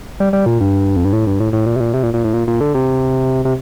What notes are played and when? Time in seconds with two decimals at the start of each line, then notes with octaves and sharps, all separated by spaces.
0.20 G3
0.33 G3
0.46 A#2
0.61 G2
0.96 F2
1.05 G2
1.13 A2
1.27 G2
1.40 A2
1.53 A2
1.66 A#2
1.76 C3
1.80 A#2
1.94 C3
2.03 A#2
2.14 A#2
2.24 A2
2.34 A#2
2.48 A#2
2.61 D3
2.74 C3
3.45 C3